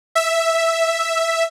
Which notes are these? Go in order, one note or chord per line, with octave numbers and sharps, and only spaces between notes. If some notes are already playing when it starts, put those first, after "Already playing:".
E5